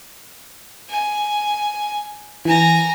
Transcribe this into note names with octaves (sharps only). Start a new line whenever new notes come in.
G#5
E3 G#5 A#5